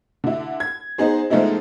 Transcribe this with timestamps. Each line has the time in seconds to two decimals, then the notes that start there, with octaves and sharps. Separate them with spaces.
0.24 D3 E4
0.60 G#6
0.98 B3 D#4 G#4 C5
1.30 F3 G#3 A3 B3 D#4 E4